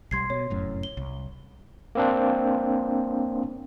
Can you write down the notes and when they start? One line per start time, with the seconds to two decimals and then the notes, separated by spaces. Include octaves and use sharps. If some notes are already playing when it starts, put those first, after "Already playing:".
0.11 B1 G3 C6 G#6 C7
0.30 B2 C#5
0.50 F1 F#2 A2
0.83 G7
0.97 C2
1.95 A#3 C4 D4